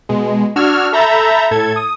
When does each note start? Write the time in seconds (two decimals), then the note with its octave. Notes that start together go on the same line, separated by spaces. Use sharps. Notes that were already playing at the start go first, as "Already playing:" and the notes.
0.09 B2 G#3
0.56 D4 F#4 E6 F6 G#6
0.92 A4 E5 A#5 B5 G6 A6
1.51 A2 A4 G#6
1.76 D#6